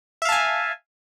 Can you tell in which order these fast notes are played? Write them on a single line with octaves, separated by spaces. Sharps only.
E5 F5 A5 G#5